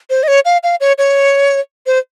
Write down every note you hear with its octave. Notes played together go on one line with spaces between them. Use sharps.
C5
D#5
C#5
F5
F5
C#5
C#5
C5